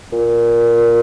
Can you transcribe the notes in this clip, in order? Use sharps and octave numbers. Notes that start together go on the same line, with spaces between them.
A#2